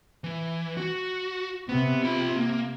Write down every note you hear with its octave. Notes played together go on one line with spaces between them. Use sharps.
E3
F#4
C3 B3
F4 B5
A#3